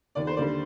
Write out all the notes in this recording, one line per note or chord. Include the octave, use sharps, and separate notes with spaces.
D#2 D5
C5
D3 G3 A#3 D5